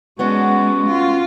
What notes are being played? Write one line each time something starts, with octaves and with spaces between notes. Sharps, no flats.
G#3 B3 C#4 D4 F#4
F4